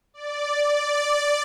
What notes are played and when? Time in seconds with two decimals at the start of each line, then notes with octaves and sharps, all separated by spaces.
0.14 D5
0.53 D5
0.93 D5